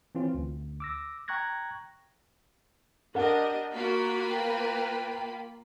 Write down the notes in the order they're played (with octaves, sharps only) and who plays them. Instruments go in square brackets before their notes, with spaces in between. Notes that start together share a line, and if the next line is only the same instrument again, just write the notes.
[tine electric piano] E3 C4 C#4 F4
D2
D6 E6 A#6
G5 A#5 C#6 F#6 G#6 A#6
[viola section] D4 G4 D#5 [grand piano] A#4 F#5
[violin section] A#3 F4 B5 [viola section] F#4
[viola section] B4 [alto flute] G5